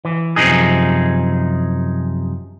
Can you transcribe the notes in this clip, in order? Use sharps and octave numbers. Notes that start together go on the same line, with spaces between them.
E3
F#2 C3 F3 D#4 G#4